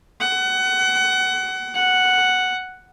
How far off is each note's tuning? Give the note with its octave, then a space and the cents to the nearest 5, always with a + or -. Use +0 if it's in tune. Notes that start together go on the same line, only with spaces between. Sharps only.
F#5 +25
F#5 +0